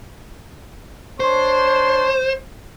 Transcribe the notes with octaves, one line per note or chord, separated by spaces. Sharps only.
D4 C5 C#5 C6